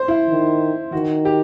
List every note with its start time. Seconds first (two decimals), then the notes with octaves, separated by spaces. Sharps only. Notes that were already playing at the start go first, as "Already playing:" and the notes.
Already playing: C5
0.08 E4
0.29 D#3
0.92 D#3 F#4
1.25 G4